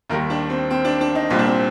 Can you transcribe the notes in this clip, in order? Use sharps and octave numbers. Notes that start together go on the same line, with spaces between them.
D#2 D#3 G3 A#4
D4
C4
C4
D4
D4
D#4
C2 A#2 G3 C4
D4
C4